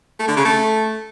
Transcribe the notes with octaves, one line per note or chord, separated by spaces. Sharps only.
A3
D3
C#3
A3